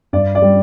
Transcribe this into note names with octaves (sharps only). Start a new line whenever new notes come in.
G2 D5
D5
G3